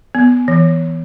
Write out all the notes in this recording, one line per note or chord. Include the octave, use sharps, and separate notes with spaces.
B3
E3